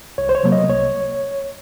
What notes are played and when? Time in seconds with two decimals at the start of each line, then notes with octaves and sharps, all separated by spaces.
0.18 C2 C#5
0.29 C5
0.35 C#5
0.43 C3 F#3 A#3
0.52 D#5
0.69 C2 C#5